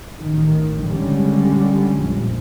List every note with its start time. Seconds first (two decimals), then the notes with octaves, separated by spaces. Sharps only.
0.19 A1 D#3
0.85 D3 G3 G#3 C#4
1.97 A#1 F2